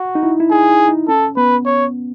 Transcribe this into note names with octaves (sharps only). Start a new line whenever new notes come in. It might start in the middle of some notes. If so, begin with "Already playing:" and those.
Already playing: F#4
D#4
E4
E4
D#4 G#4
E4
D#4
C#4 A4
B3 B4
C#5